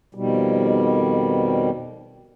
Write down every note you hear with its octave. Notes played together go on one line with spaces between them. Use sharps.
F2 B2 D#3 G3